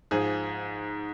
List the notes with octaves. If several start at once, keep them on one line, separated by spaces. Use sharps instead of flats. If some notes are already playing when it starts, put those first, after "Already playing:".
G#2 F3 G#4